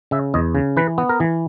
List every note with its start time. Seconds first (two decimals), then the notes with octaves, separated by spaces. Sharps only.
0.11 C#3 E5
0.34 E2 D#5
0.55 C#3
0.77 E3 B4
0.98 B3
1.09 A#4
1.20 E3